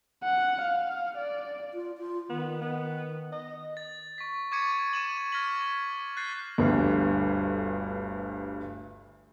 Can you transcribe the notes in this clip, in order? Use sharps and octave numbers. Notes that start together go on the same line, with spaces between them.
F#5
F5
D5
F4
F4
D#3 B3
B3
D#5
A6
C#6 B6
C#6 D6 G#6 A6 C#7 D#7
D6 D#7 E7 F#7
F6 G#6 A#6 B6 F#7
F#6 G6 A6 C7
G1 D2 G2